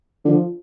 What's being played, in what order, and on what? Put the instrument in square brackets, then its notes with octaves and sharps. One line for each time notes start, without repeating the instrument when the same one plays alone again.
[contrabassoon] D3 [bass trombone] F3